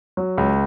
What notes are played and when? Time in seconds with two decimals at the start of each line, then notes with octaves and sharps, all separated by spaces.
0.17 F#3
0.38 C#2